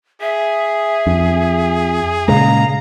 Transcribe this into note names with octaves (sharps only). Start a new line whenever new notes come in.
G#4 E5
F2
A#2 C#3 G#3 F5 A#5